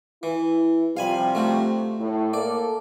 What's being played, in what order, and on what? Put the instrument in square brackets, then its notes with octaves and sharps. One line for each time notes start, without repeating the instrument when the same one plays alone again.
[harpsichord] E3 [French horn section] E4
[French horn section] C3 F3 G3 [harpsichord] F5 G#5 B5
[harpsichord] A3 F#4
[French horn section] A2
[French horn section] A#3 A4 [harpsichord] D5